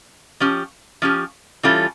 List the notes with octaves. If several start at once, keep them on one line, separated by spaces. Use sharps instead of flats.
F3 C#4 G4
F3 C#4 G4
E3 G3 C#4 F4 A4